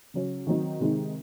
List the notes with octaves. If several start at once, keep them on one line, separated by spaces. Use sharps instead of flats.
C#3 F#3 C#4
D#3 F#3 C4 D#4
C3 D#3 G#3 C4 D#4